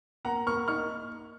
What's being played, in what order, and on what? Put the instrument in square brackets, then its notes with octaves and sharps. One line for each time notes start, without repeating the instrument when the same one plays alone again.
[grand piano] A#3 [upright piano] F#5 A#5
[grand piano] A#3 [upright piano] C#6 F6
[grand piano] D#4 [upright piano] C#6 F6